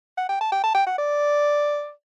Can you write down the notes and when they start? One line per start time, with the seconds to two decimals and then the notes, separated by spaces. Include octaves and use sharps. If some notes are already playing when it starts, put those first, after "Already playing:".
0.18 F#5
0.29 G5
0.41 A5
0.52 G5
0.64 A5
0.75 G5
0.87 F#5
0.98 D5